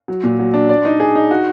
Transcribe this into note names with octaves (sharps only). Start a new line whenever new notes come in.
F#3
A#2
F#3
D4
D5
D#4
G#4
D#4
F#4